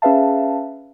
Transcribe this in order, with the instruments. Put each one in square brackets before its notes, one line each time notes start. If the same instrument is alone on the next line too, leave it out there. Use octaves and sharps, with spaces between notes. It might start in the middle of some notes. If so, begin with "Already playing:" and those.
[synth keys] C#4 G#4 B4 E5 F5 A5